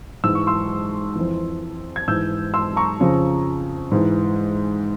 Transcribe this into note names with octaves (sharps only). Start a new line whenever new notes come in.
G#2 E3 E6
C#6
C6 E6
F2 E3
G#6
G#2 E3 E6 G6
C6 E6
A#5 C#6
F2 C#3 F3
G#2 E3